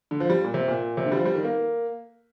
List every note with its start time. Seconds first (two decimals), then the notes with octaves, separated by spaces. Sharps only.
0.11 D3
0.20 F3
0.30 G3
0.44 A#2
0.54 C3
0.68 A#2
0.97 C3
1.06 D3
1.12 G3
1.16 F3
1.26 G3
1.35 D#3
1.45 A#3